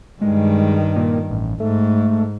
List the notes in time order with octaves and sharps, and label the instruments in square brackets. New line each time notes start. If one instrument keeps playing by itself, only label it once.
[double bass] G2 D#3 [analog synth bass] G#3
[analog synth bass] A#2
A1
[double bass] G#2 [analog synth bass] A3